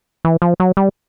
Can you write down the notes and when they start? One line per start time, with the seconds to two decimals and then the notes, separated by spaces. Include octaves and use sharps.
0.25 E3
0.42 F3
0.60 F#3
0.77 G3